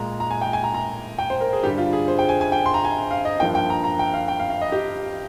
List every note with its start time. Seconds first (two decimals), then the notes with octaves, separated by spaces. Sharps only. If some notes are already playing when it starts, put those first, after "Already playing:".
Already playing: A#2 G#3 A#5
0.20 A#5
0.31 G#5
0.42 G5
0.53 G#5
0.64 A#5
0.74 A#5
1.18 G5
1.30 C5
1.41 A#4
1.53 G#4
1.63 G2 D3 G3 G4
1.78 F4
1.93 G#4
2.08 C5
2.19 G5
2.29 G#5
2.41 G#5
2.52 G5
2.66 C6
2.74 A#5
2.85 G#5
3.11 F5
3.25 D#5
3.40 A#3 G5
3.42 G2 F3
3.55 G5
3.70 A#5
3.84 A#5
3.99 G5
4.14 F5
4.28 G5
4.40 F5
4.50 F5
4.61 D#5
4.72 G4